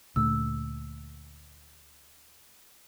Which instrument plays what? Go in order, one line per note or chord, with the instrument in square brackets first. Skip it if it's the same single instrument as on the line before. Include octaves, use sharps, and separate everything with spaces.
[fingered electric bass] D2 A#2 A3 [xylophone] E6